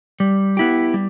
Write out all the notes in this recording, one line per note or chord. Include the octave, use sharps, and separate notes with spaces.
G3
B3 E4 G4
G3